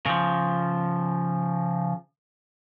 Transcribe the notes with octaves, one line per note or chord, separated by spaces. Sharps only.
C#3 F3